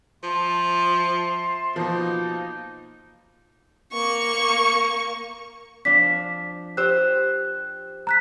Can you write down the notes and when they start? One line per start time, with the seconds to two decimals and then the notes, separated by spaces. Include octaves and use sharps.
0.23 F3 E5 A5 C6
1.76 B2 F3 A#3 D#4
3.93 A#3 C#6
5.85 F3 D4 B6
6.77 G4 C5 E6 F#6
8.07 A#5 F#6 B6